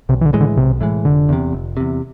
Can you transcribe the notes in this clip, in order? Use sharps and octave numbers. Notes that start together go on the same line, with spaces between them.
B1 C3
E3
D3
A2 E3 G#3
D3
B1 C3
A2 E3 G#3
F1 D3
E2 C3
F1
E2 C3